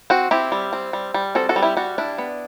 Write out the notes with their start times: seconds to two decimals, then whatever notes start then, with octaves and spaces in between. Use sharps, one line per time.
0.10 C4 F#4
0.31 C4 E4 G4
0.52 G3
0.73 C4
0.93 G3
1.14 G3
1.35 C4 F#4 A4
1.49 F#4 A4
1.56 G3
1.62 E4 G4
1.77 G3 F#4
1.98 D4 E4
2.18 B3